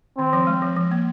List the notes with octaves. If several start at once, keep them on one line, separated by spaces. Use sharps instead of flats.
D#3 C4
F3
G#3
F3
F3
A#3